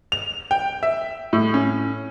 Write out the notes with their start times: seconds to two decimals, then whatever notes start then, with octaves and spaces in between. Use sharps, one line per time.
0.12 F7
0.51 G5
0.83 E5
1.33 A2
1.54 C#4